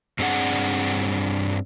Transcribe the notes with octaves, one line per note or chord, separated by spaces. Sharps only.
G2 C4 D4 G#4 F#5